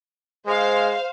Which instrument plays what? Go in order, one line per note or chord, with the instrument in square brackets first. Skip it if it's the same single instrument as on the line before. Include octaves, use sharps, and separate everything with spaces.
[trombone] G#3 [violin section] C5 F5